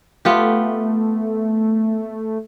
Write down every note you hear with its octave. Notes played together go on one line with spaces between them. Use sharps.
A3 B3 F4 G4